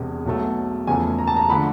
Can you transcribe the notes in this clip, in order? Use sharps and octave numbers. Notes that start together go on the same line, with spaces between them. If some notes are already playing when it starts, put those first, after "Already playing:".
Already playing: E1 E2 C3
B1 B2 F#3 A3
E2 C#3 F3 A3 G#5
A#5
A5
A#5
D3 F3 A3 B5